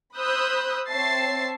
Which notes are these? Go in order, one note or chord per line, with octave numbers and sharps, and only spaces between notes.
C5 B5 D#6 E6 F#6 G6
C4 C#5 E5 A5 A6 C7